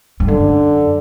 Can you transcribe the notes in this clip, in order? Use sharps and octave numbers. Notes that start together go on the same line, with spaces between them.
G2
F#2 D3